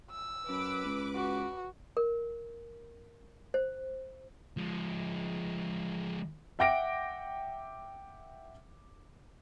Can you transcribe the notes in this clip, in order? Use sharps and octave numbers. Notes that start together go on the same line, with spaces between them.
E6
F#2 B4 D6
C#2
F#4
A#4
C5
F3 G#3
E5 F#5 G5 D6 A#6 D7